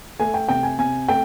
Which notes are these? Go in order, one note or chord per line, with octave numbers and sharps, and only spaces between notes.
A3 G#5
G5
C3 G5
G#5
C3 G#5
A3 G5